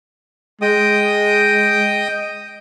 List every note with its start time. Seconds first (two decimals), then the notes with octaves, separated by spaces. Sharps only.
0.62 G#3 D#5 G5 D#6